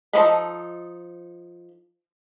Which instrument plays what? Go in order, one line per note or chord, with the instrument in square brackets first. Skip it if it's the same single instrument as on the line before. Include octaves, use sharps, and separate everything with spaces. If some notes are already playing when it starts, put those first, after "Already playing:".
[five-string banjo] F3 D#4 A4 D#5 B5